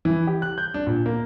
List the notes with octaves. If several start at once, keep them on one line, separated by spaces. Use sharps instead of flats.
E3
G4
F#6
G6
D4
A#2
A#3